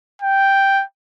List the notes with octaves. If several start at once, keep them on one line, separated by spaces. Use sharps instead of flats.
G5